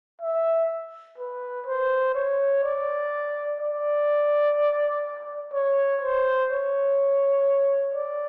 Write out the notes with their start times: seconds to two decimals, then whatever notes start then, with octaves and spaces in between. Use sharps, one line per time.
0.21 E5
1.18 B4
1.66 C5
2.15 C#5
2.63 D5
3.60 D5
5.53 C#5
6.01 C5
6.50 C#5
7.94 D5